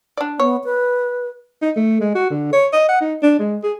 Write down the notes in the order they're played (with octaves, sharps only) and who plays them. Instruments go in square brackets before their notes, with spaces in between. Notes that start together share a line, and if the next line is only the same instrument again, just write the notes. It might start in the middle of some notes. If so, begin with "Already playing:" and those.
[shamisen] D4 D5
[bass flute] B3 [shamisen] C#5
[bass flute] B4
[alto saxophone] D#4
A3
G#3
F#4
D3
C#5
D#5
F#5
D#4
D4
G#3
G#4